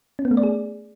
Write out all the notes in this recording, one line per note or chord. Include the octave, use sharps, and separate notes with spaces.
C#4
B3
A3
D5
G#4